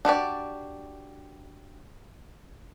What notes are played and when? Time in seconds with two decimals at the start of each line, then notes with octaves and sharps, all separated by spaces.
0.05 D4 F#4 G4 D5